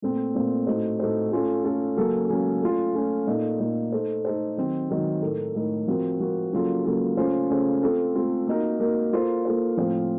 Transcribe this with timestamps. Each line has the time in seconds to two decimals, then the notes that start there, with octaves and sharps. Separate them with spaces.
0.02 A#2 A3 C4
0.35 A#2 A3 C4
0.67 A2 A3 D#4 F#4 C5
0.99 A2 A3 D#4 F#4 C5
1.32 A3 C#4 F4 A4
1.64 A3 C#4 F4 A4
1.97 C#3 F#3 A#3 C#4 A4
2.29 C#3 F#3 A#3 C#4 A4
2.62 A3 C#4 F4
2.95 A3 C#4 F4
3.27 A#2 A3 D#4
3.60 A#2 A3 D#4
3.92 A3 D#4 A4 C5
4.25 A3 D#4 A4 C5
4.57 D#3 F#3 C4
4.90 D#3 F#3 C4
5.22 A2 A3 D#4 A#4
5.55 A2 A3 D#4 A#4
5.87 F3 C4 F#4 A#4
6.20 F3 C4 F#4 A#4
6.53 C#3 F#3 A#3 F4 A4
6.84 C#3 F#3 A#3 F4 A4
7.17 C#3 A3 C#4 F4 C5
7.50 C#3 A3 C#4 F4 C5
7.83 A3 C4 F4 A4
8.15 A3 C4 F4 A4
8.47 A#3 D#4 F#4 A#4
8.80 A#3 D#4 F#4 A#4
9.13 A#3 F4 A4 C5
9.45 A#3 F4 A4 C5
9.77 A2 F3 C4 F4 C5